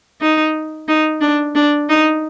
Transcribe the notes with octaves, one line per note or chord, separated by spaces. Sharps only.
D#4
D#4
D4
D4
D#4